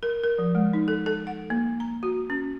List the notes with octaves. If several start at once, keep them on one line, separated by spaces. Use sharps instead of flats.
A#4
A#4
F3
G#3
D#4
A4
A4
F#5
A#3
A#5
F#4
C#4